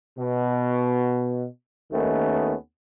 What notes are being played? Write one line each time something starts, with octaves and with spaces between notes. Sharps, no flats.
B2
D#2 D#3 A3 B3 C#4